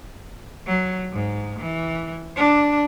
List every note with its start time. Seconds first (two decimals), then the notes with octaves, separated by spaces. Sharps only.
0.67 F#3
1.13 G#2
1.59 E3
2.36 D4